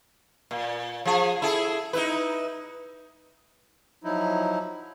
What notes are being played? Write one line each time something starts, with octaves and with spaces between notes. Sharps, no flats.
A#2
F3 G#4
E4 G#4 A4
D#4 E4 B4
F3 F#3 D#4 E4